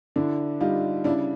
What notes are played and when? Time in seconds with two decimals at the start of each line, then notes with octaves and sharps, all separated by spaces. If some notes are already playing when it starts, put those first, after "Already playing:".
0.16 D3 D4 E4
0.61 G3 D#4 F4
1.04 C#3 D4 E4